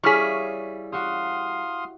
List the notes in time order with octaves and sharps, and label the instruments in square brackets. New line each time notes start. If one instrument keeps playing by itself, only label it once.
[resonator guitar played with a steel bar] G3 G#4 [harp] E4 C#5 F5 [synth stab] C#6 F6 B6
[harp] F#4 G4 [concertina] F5 C6 D#6